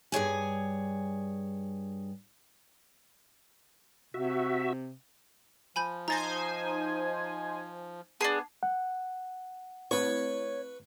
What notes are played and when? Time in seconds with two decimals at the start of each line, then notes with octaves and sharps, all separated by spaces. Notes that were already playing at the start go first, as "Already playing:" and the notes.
0.12 G2 G#4 C#5 G#5
4.14 C3 F#4 E5
5.76 F3 G#5 B5 G6
6.08 D#4 C5 G#5 A#5 A6 A#6
8.21 B3 D4 G#4 A5 C7
8.63 F#5
9.91 A3 C4 E4 B4 C#5 C#6